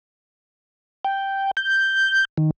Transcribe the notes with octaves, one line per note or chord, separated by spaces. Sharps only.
G5
G6
D#3